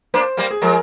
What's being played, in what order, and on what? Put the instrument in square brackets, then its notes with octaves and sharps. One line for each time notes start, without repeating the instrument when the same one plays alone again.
[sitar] A#3 D4 [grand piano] C5
[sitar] G3 A#3
[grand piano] G#4
[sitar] F3 G#3 [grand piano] A#4